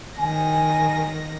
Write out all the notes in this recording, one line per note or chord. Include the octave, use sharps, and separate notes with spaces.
D#3 G#5 A#6